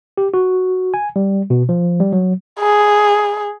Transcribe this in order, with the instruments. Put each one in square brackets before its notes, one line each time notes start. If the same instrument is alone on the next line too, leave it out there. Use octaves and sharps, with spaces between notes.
[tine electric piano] G4
F#4
G#5
G3
B2
F3
G3
F#3
[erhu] G#4